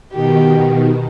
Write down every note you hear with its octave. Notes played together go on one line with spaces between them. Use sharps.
B2 D#3 G4